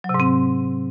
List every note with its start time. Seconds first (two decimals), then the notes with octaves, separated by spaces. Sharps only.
0.04 F#3
0.09 C3
0.14 G#2
0.20 C4